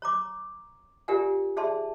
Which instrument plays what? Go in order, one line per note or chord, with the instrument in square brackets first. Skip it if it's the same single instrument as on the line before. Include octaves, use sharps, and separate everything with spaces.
[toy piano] C#5 A#5 D6
F4 G4 A#4 D5 F#5 G#5
G#4 D5 E5 A5 C6